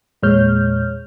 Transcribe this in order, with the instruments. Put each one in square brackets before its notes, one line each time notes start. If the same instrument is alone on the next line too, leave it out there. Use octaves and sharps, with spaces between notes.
[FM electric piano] E2 A#2 G#3 C#5 F6 G6